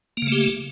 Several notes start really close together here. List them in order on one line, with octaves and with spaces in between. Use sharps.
A#3 C#3 A3 G4